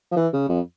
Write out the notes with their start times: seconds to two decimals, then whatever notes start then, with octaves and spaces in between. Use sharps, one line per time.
0.12 F3
0.17 E3
0.33 C#3
0.49 F2